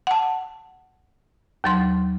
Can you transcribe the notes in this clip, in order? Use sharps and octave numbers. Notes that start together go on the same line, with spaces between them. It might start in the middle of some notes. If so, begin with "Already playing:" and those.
F#5 A5
D#2 F#3 C6